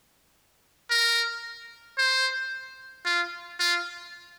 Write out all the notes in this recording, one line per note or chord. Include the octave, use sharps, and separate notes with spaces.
A#4
C5
F4
F4